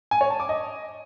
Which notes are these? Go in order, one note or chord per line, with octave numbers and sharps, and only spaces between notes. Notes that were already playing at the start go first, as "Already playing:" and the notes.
G#5
C#5
A5
D6
D#5